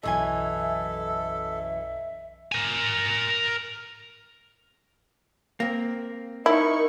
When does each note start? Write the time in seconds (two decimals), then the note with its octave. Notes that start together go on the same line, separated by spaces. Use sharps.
0.03 B1 F#2 E3 A4 D#5 E5 G#5
2.52 A#4 G#5
5.60 A#3 C4
6.46 D#4 E4 A#4 C#6